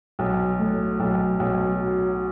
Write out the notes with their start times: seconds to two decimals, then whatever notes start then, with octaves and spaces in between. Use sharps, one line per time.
0.19 B1
0.59 A2
1.00 B1
1.39 B1
1.81 F#3